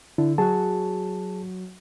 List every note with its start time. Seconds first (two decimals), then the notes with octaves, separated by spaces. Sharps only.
0.18 D3 E4
0.38 F#3 F#4 G#4 A5